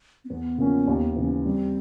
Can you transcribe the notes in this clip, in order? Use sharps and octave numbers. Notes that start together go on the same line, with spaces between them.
C4
E2 B3
C#3 F3 A#3 C#4
D#2
C#3 E3
G3 C4